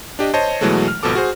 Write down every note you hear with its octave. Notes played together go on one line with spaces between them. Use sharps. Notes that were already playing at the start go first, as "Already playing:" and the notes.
D4 G4 D#5
C5 C#5 D#5 A5
B2 E3 F#3 G#3 A3
F6
G#1 B2 F3 A4 D6
F#4 G#4 C5